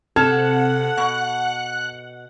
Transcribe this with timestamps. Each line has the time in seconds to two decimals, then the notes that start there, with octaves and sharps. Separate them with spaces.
0.16 C3 A4 F#5 A5 F6 G#6
0.97 B2 F#6